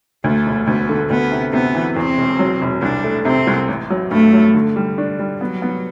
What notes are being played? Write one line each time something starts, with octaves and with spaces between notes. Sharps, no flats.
D2 A3
E1
D2 B3
D3
D2 B3
C3
C3 B3
E3
E2 C4
E1
F#3
E1
C2 D4
A3
C3 C4
C2
A1
F#3
G2 A3
F#3
D3
G3
D4
G3
F#3 B3
B3